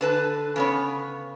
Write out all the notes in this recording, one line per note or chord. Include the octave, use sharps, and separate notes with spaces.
D3 B4 A5
C#3 B3 C#5